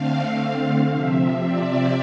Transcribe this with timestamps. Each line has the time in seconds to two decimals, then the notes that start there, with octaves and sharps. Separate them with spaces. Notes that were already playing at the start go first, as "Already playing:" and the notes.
Already playing: D3 A3 C4 F5
0.91 C3 F3 C4 E5
1.42 D5